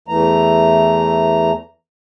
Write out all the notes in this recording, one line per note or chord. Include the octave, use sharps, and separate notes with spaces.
E2 E3 A3 A#5